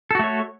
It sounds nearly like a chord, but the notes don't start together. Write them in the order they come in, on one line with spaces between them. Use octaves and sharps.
A4 F#4 A3 C#5